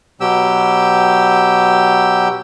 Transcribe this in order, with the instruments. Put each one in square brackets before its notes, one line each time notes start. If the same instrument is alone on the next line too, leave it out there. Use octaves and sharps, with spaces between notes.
[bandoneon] B2 F#3 G4 G5 E6